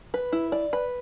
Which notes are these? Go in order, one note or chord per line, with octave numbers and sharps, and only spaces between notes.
B4
E4
D5
B4